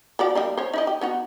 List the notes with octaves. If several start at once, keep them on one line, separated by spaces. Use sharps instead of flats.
F3 F#4 D5
G3 A#3 D#4
C5 C#5
D#4 E4 D#5
G4
B3 D#4 F#4